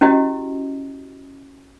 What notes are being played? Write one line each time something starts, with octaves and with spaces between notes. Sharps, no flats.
C#4 E4 F#4 G4 D#5